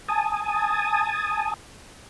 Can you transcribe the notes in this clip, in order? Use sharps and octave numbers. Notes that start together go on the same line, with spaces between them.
G#5 A5 D#6